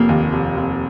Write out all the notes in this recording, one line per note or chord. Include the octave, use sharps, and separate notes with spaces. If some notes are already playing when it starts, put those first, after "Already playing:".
Already playing: F1 A#3
D#2
F1
F1